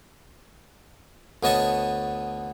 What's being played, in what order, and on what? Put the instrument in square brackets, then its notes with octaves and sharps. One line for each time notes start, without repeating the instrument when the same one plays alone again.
[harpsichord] D2 B3 C#5 D#5 A5 C#6